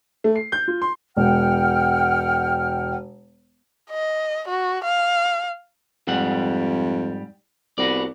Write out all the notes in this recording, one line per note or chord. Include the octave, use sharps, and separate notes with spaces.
A3
C7
G6
F4
C6
E1 F#5 G5 F6
D#5
F#4
F5
F2 G#2 G3 F#5
C2 B3 F#4 D5